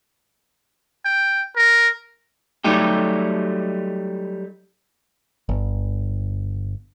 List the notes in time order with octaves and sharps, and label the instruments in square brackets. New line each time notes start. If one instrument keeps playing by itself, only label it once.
[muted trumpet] G5
A#4
[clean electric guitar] F#3 G3 A3 D#4 G4
[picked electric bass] G1